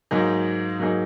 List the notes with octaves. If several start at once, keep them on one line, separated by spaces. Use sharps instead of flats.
G#2 F#3 A#3 D#4 G#4
G#2 F#3 A#3 D#4 G#4